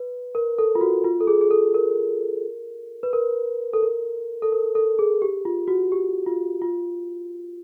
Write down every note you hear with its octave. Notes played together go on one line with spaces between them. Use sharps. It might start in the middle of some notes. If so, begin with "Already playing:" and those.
Already playing: B4
A#4
A4
F4
F#4
F4
A4
G#4
G#4
A4
A#4
B4
A#4
A4
A#4
A4
A#4
A4
G#4
G4
F4
F#4
G4
F4
F4